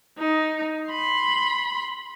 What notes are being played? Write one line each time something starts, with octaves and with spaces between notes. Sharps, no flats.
D#4
B5 C6